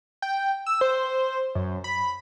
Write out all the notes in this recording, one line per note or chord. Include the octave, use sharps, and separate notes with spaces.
G5
E6
C5
F#2
B5